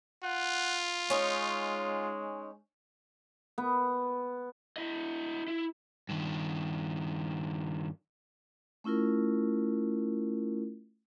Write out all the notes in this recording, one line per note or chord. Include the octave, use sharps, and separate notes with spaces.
F4 F#5
G#3 C#4 D#4
B3
E4 D#5
E4
G2 D#3
A3 C#4 E4 F4 A#4